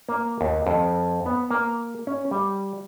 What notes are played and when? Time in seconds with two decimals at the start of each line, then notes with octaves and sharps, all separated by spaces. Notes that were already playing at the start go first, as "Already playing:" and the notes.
0.09 A#3
0.41 D#2
0.67 F2
1.26 B3
1.50 A#3
2.07 C#4
2.31 G3